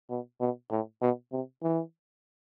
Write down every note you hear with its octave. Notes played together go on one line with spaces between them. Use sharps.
B2
B2
A2
B2
C3
E3